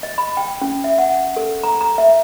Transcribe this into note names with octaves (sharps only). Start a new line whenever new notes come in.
D#5
B5
G5
C#4
E5
F#5
A4
A#5
A#5
E5